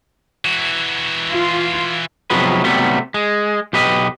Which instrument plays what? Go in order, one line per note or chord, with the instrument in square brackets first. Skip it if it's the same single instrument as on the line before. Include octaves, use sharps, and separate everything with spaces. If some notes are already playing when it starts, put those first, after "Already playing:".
[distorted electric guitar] E3 F#4
[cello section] F4
[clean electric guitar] C3 F3 F#3 G#3 B3 B4
C3 F#3 G3 A3 B3
G#3
B1 G4 B4 D#5